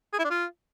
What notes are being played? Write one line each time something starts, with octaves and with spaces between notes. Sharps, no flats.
G#4
E4
D4
F4